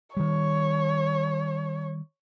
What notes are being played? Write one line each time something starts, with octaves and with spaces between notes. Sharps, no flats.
D#3 G3 C#5